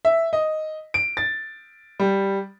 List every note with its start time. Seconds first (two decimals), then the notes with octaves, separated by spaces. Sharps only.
0.05 E5
0.33 D#5
0.94 D7
1.17 A6
2.00 G3